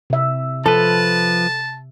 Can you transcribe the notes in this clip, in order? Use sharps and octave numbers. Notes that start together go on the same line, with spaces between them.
C3 E5
F3 A4 B4 A5